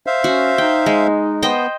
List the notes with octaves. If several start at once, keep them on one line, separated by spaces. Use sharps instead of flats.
C5 E5 F5
C#4 F#4
D#4 G5
G#3
B3 C5 D#5 G5